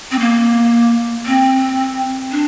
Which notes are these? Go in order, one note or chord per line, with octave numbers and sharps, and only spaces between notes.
C4
A#3
C4
D4